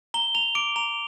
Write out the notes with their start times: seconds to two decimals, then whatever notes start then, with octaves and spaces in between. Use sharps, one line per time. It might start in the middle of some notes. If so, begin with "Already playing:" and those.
0.14 A#5 G7
0.35 A#5 F7
0.55 D6 D7
0.76 A#5 F7